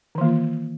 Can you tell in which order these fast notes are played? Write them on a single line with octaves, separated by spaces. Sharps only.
D#3 E3 A#3 F4